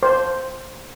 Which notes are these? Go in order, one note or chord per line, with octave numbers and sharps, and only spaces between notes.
C5